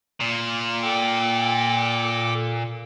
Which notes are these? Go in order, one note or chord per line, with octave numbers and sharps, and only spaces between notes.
A#2
A4 G5 D6